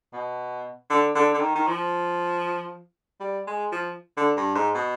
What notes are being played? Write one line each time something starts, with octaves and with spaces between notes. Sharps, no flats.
B2
D3
D3
D3
D#3
D#3
F3
G3
G#3
F3
D3
G2
G#2
B2